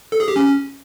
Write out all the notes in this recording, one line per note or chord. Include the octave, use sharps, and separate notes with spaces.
A4
G#4
G4
C#4